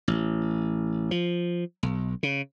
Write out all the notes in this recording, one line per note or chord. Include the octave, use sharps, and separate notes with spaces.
A1
F3
B1
C#3